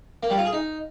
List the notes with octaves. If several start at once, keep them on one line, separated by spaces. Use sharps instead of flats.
A#3
G3
F4
G#4
D#4